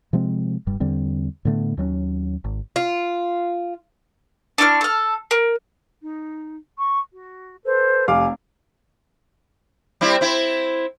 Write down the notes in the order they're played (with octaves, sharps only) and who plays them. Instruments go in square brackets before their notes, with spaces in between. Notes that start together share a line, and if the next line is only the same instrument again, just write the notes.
[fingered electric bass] C3 F3 G#3 C4
F1 G2 G3
E2 D3 G3 C4
A2 D3 A3 B3
D#2 F#3 C4 C#4
G#1
[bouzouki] F4
[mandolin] D4 E4 C#6 F6
A4 F6
A#4
[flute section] D#4
C#6
F#4
A4 B4 C5
[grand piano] F1 F5 D6 [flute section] G#5
[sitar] G3 C4 E4
C4 E4